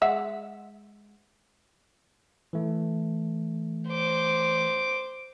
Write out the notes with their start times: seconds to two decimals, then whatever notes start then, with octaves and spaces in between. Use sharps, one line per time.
0.02 G#3 E5 F#5
2.53 E3 A3
3.89 C5 D6